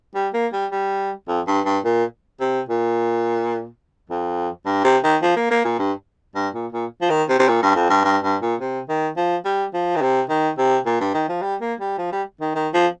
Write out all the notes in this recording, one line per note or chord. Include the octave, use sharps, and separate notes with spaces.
G3
A#3
G3
G3
F2
G2
G2
A#2
C3
A#2
F2
G2
C3
D#3
F3
A#3
A#3
A#2
G2
G2
A#2
A#2
F3
D#3
C3
C3
A#2
G2
F2
G2
G2
G2
A#2
C3
D#3
F3
G3
F3
D#3
C3
D#3
C3
A#2
G2
D#3
F3
G3
A#3
G3
F3
G3
D#3
D#3
F3